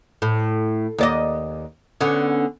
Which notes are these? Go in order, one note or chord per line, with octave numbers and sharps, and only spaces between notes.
A2
D#2 D5 D#5
D3 B3 C#4